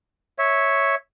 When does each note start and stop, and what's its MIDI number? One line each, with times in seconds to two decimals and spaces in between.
0.39 0.95 73
0.39 0.95 76